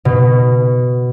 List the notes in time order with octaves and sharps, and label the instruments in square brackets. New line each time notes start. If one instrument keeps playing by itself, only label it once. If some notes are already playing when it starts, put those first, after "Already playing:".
[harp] B2